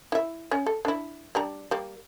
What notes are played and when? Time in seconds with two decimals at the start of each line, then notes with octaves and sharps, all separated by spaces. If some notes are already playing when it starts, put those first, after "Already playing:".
0.12 E4 E5
0.51 C#4
0.66 A4
0.85 D4 E4
1.35 G3 D4 A#5
1.71 G3 A#3